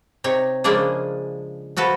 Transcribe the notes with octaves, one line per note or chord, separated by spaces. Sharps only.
C3 D#4 C#5
C#3 F3 G#3 A#3 D4 G#4
F3 F#4 A4 B4